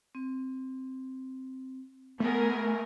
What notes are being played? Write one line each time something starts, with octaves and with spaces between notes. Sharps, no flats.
C4
A3 B3 G#4 A#4